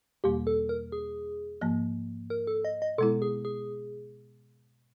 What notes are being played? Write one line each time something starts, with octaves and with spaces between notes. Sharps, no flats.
E2 B2 G3 A#3 G4
A4
A#4
G#4
G#2 F3 A#3
A#4
A4
D#5
D#5
B2 G#3 B3 E4 A4
G#4
G#4